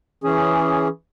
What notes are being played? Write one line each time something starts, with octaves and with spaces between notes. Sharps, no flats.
E3 C#4 G#4